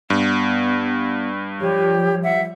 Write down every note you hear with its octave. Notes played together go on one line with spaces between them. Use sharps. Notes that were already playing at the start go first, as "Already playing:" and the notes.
G2 B3
F3 G3 G4 C#5
E5 F#5